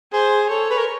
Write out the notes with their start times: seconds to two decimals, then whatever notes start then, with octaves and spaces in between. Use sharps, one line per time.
0.13 G#4 C5
0.50 A4 C#5
0.71 B4
0.78 A#4